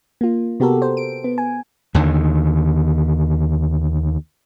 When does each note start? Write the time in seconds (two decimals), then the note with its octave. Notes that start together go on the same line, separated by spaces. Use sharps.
0.21 A#3 F4
0.60 C3 B3 F#4 G4 A4 A#4
0.82 C5
0.97 D7
1.24 B3
1.38 G#5
1.94 D#2 D3 D#3